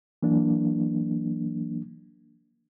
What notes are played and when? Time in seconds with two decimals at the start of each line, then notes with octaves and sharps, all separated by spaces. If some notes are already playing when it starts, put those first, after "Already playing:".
0.23 E3 F#3 A#3 D4